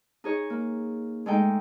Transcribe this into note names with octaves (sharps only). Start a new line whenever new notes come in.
D#4 G#4 C#5
A#3
G#3 A3 D#4 G5